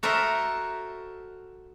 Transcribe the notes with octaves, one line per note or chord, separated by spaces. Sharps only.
F#4 A4 A#4 C5 D#5 E5